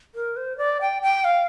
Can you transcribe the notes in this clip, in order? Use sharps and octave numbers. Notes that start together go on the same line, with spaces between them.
A#4
C5
D5
G5
G5
F5